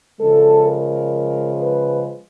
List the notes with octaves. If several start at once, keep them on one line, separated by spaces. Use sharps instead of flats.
C#3 F3 G#3 A4
A#4
B4